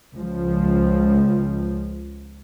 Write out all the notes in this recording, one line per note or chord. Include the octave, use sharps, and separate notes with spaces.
C#2 F3